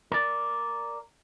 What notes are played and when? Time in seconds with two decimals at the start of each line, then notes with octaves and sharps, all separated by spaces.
0.12 A#4 D5